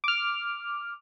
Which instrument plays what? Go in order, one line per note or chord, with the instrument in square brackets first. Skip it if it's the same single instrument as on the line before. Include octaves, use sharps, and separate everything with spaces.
[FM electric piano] D6 F6